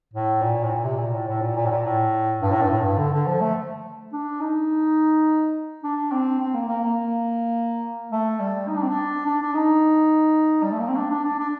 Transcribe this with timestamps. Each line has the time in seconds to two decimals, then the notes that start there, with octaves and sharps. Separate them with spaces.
0.14 A2
0.42 A#2
0.63 A2
0.71 A#2
0.85 C3
0.99 A#2
1.13 A2
1.28 A2
1.41 A#2
1.56 A#2
1.66 A2
1.71 A#2
1.85 A2
2.42 G2
2.52 A2
2.62 G2
2.71 A2
2.81 G2
2.98 D3
3.13 D3
3.27 F3
3.41 A3
4.13 D4
4.41 D#4
5.83 D4
6.12 C4
6.40 C4
6.55 A#3
6.69 A#3
6.83 A#3
8.12 A3
8.40 G3
8.68 D#4
8.76 D4
8.83 C4
8.90 D4
9.26 D4
9.42 D4
9.54 D#4
10.63 G3
10.72 A3
10.80 A#3
10.88 C4
10.96 D4
11.10 D4
11.24 D4
11.39 D4